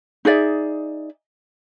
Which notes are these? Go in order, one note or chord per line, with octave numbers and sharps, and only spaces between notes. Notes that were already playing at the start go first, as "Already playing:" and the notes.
D#4 G#4 D5 E5